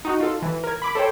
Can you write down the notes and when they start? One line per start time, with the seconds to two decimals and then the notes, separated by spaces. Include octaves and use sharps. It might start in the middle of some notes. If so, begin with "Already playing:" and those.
0.05 D#4 F#4
0.20 F4 A4
0.42 E3
0.64 A#4 G#6
0.82 B5 D6
0.95 A4 C5 C#5 G5